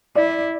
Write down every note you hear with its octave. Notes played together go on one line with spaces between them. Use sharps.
E4 D5